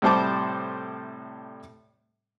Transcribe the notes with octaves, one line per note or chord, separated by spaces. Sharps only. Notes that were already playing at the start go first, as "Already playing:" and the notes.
A2 C3 G3 C5 A5 D6